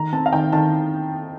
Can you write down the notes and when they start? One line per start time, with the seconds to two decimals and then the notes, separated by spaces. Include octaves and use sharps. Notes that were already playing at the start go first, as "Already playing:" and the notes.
Already playing: D#3 A#5
0.13 C4 A5
0.26 F5
0.33 D#3 G5
0.52 D#3 A5